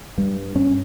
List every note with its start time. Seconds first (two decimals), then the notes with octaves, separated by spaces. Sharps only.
0.18 G2 G3
0.55 G2 C#4